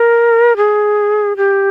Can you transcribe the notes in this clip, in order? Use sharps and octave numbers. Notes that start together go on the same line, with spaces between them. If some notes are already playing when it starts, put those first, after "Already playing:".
Already playing: A#4
G#4
G4